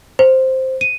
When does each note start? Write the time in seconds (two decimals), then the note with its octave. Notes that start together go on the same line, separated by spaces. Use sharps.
0.19 C5
0.81 D#7